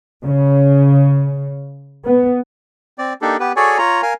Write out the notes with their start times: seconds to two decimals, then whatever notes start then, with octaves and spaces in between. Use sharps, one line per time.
0.25 C#3
2.04 B3
2.98 C4 D5
3.22 A#3 D4 D#4 G4 A4
3.40 B3 G4 B4
3.56 F#4 G#4 A4 C#5 D5 G#5
3.78 F4 C#5 A#5
4.02 A#4 F5 G#5